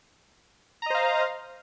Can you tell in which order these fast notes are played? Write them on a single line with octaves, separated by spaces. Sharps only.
A#5 D#5 C5 F5